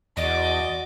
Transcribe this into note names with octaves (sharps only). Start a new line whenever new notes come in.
E2 F#4 D5 D#5 D6